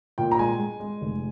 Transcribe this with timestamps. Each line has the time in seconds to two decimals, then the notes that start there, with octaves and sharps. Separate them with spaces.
0.18 A#2 G5
0.31 A#5
0.39 G#3 G#5
0.59 G#3
0.80 G#3
1.01 F1